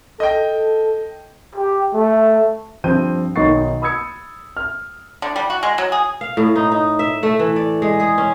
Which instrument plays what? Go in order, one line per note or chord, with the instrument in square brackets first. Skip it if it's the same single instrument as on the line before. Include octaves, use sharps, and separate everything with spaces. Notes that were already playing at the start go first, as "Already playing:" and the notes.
[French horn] A4 [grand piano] D#5 G5
[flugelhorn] G4
A3
[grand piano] G2 F3 C4 G6 D#7
B1 D#3 D#4 C#6 A6 C7
B5 D#6 E6 G#6 C#7
F6
[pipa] D3
G3
F#4
G#3
F#3
G#4
[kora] F5
A2
D#4
D#4
E5
A3
E3
D5
G#3
G#4
C#4